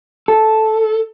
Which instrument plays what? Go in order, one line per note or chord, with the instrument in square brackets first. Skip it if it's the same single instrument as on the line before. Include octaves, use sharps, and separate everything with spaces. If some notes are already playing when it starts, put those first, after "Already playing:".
[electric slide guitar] A4